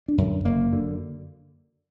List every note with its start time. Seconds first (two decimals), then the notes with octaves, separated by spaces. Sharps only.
0.08 D4
0.18 F#2 D3
0.45 F#1 A#3
0.72 F#2 D3